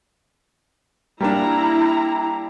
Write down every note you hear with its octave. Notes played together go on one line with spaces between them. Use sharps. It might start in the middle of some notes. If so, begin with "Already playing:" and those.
G3 A#3 D4 E4 A#5